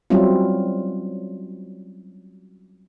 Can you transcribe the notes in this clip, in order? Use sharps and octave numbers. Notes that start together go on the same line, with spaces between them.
F#3 G3 C4 C#4 E4 F4